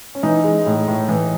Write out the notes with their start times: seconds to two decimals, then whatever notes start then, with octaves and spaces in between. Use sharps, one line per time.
0.15 C#4
0.23 E3 D#4
0.44 G#3
0.66 A2
0.88 A2
1.09 E3